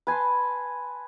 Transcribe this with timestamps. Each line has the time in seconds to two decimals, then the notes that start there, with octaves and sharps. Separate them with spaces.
0.07 B4 G#5 A5 C6